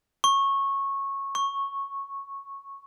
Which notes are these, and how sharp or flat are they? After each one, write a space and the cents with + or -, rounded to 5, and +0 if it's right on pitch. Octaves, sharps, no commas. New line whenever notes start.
C#6 -15
C#6 -5